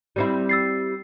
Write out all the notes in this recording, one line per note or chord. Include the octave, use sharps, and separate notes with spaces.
G3 C4 E4
E6 A6 C7